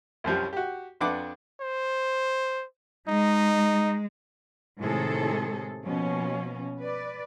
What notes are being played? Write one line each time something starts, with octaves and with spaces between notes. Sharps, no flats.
C2 F#2 F3 G3
F#4 G4
F2 D4 B4 F#5 D6
C5
G#3 D#4
A2 C3 D#3 G#3 G#4 A4
B2 F3 A#3 C#4
B4 D5